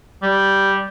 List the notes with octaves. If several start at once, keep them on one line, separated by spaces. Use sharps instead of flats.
G3